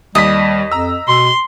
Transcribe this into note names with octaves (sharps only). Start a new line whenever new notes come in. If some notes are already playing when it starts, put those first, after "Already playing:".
D#2 G3 D#5 B6
F2 A#5 E6
B2 C6